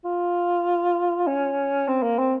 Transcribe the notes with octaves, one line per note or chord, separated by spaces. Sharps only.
F4
C#4
C4
A#3
C4